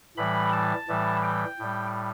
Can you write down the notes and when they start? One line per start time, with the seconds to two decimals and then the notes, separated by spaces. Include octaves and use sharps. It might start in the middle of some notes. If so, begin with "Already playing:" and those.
0.17 A2 E3 G3 B5
0.52 A5
0.88 A2 E3 G3
1.24 G5
1.59 A2 G3